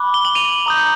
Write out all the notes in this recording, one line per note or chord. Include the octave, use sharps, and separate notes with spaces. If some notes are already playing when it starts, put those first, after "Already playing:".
Already playing: B5 D6 F#6
G7
F#7
D#7 F7
A#5 D#6 G6